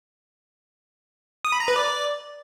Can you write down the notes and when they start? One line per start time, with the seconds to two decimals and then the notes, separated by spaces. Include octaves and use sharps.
1.45 D#6
1.52 B5
1.60 A#5
1.68 B4
1.76 D5